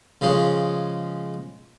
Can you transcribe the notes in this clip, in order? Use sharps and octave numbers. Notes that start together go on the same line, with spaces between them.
C#3 F3 G#3 C#4